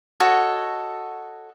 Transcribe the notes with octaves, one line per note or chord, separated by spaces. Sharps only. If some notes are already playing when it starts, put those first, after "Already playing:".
F#4 A4 C#5 D#5